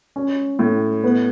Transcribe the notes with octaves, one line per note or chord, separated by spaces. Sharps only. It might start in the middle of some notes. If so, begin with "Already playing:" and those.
C#4
A2
B3